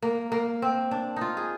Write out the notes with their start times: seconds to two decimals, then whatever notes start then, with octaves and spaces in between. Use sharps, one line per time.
0.02 A#3
0.32 A#3
0.62 C4
0.91 D4
1.16 D#4 F4
1.37 G#4